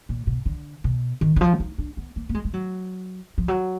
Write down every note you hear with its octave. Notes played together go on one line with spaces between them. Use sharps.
A#2
B2
D3
B2
D#3
D#3
F3
D#4
D4
B3
A#3
A#3
G#3
G#3
F#3
F3
F#3